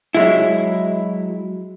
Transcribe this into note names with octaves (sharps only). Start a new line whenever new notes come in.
F#3 G#3 E4